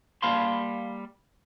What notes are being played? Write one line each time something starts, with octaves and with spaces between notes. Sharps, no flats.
G3 A#3 F5 A5 B5 C6